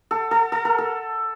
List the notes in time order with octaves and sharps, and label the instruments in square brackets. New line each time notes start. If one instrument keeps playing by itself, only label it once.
[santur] A4
A4
A4
A#4
A4